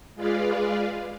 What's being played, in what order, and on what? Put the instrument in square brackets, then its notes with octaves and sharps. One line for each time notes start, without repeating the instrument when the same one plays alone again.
[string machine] G#3 F4 G#4 B4 D5 F5